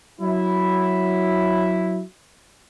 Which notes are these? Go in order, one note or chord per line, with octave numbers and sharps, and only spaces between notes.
F#3 E4